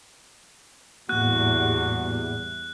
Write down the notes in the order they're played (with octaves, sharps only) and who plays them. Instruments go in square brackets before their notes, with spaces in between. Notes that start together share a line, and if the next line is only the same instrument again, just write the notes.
[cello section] E2 G3 [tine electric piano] A2 A#3 [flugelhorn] F#4 [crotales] F#6